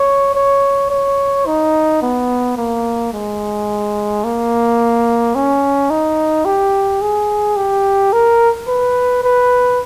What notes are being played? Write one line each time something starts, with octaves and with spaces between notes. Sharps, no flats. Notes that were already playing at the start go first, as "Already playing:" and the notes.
Already playing: C#5
C#5
C#5
D#4
B3
A#3
G#3
A#3
C#4
D#4
G4
G#4
G4
A#4
B4
B4